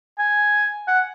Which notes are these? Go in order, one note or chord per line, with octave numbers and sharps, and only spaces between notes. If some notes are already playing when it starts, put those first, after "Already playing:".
G#5
F#5